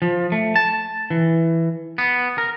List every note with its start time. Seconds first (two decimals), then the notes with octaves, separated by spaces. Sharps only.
0.02 F3
0.32 A3
0.56 A5
1.10 E3
1.98 B3
2.38 A#4